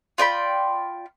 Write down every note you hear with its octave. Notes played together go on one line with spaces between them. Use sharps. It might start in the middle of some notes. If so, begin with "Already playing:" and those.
F4 D5 G5 B5